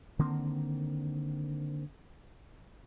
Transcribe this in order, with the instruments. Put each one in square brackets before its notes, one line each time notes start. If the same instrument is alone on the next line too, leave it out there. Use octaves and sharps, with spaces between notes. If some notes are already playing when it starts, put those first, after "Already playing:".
[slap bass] D3 D#3 A#3 C4